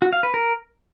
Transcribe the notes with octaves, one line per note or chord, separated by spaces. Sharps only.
F#4
F5
B4
A#4